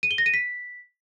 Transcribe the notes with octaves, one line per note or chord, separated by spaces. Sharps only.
D#7
G7
A#6
D#7
B6